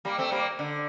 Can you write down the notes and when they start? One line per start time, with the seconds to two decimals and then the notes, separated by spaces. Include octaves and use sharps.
0.05 G3 A#3
0.18 A3 C4
0.32 G3 A#3
0.59 D3